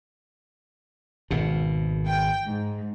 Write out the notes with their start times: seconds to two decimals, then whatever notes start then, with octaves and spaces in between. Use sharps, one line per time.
1.31 G#1 B2
2.06 G5
2.46 G#2